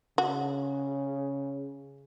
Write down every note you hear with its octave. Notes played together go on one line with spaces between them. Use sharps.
C#3 F#4